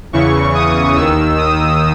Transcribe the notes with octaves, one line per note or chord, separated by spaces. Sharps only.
E2 C#3 E3 C#6
D#6
D#2 D#3 E6
D#6